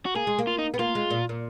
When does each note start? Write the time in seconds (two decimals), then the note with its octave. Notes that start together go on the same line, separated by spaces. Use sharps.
0.05 F#4
0.15 A#3 G#4
0.27 G#3
0.39 A#3
0.47 F4
0.58 D#4
0.74 B3
0.79 A#3 F4
0.95 G#3
1.10 A#2
1.29 A#2